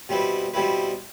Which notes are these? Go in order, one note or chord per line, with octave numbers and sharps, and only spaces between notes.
B2 G3 C4 E4 B4
B2 G3 C4 E4 B4